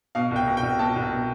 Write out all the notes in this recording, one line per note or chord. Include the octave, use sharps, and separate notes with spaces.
B2 F5
C2 G5
B2
G5
C2
B2 A5
C2
B2